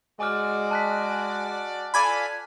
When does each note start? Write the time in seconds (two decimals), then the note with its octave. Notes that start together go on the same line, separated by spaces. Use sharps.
0.20 G#3 F#4 D5 G#5 D6 F6
0.71 A5 F#6 B6
1.94 F4 A4 D5 G#5 B5